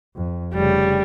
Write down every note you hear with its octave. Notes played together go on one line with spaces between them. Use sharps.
F2
F1 C#3 G3